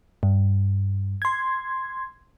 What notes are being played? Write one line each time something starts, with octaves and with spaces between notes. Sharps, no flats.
G2
C6 G#6